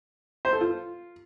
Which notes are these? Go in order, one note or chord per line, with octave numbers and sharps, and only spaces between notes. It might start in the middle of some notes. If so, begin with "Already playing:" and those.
C5
A4
F4